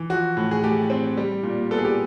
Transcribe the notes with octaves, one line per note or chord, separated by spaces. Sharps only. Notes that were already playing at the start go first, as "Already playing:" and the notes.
Already playing: E3
F3 F#4
A2
G#4
A3 G4
C4
G3
A#2
B3 A4
G#4
G4